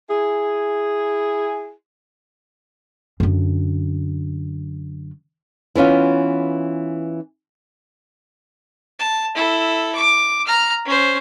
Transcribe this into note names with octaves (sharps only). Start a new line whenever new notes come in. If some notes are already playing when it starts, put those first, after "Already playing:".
E4 G#4
F#2 D3
E3 B3 C#4 F4
A5
E4 A4
D6
A#5 F6
C#4 C5